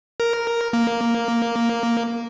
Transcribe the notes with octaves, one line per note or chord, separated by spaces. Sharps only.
A#4
A#3